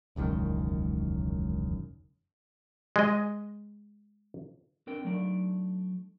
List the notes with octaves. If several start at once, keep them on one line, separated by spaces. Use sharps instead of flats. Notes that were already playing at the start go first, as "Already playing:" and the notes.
E1 C#2 F#2 D#3
G#3 D#5
C4 D4 A#4 G5
F#3 A3 D4 D#4 D5